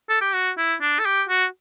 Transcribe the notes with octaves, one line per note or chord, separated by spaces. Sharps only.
A4
G4
F#4
E4
D4
A4
G4
F#4